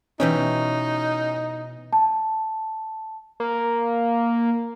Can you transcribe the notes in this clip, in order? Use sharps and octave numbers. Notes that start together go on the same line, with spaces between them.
B2 E3 C#4 D#4 G5
A5
A#3